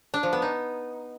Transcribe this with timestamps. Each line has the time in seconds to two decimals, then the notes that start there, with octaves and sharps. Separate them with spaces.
0.14 D4
0.23 F3
0.33 B3
0.42 D#4